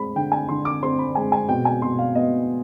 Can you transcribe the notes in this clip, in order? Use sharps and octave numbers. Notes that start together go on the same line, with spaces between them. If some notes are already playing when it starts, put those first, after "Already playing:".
Already playing: G#3 C4 B5
D3 G5
G#5
D3 C6
D6
C4 C6
B5
G#3 G#5
G#5
B2 G5
G#5
B2 C6
F5
B3 D#5